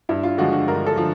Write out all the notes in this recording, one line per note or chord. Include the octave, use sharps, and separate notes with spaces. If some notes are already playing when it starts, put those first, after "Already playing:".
G2 E4
F4
D3 F3 G#3 F#4
F#4
G2 A#4
A4
D3 F3